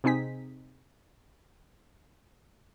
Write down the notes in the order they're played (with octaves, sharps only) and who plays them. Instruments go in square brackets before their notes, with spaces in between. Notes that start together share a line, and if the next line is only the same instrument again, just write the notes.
[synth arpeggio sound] C3 C4 D#4 G#4 B6